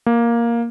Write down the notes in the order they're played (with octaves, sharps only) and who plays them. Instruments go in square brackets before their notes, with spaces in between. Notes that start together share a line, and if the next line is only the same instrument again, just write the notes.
[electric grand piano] A#3